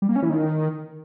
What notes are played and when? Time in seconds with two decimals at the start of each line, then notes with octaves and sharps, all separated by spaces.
0.02 G3
0.09 A#3
0.16 C#4
0.23 E3
0.29 D#3